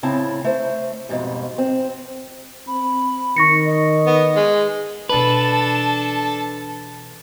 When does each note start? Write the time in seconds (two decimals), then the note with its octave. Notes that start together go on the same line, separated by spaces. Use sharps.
0.03 A2 C#3 C4 E4 A5 A#5
0.44 A3 C5
1.09 F2 G#2 B2 G3
1.58 C4
2.67 C4 B5
3.37 D#3 C#6 A#6 C#7
3.66 D#5
4.07 B3
4.36 G#3
5.09 B2 E3 D4 A4 B4 A5